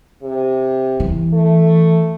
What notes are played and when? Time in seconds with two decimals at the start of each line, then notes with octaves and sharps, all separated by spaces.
0.23 C3
1.00 E3
1.33 A3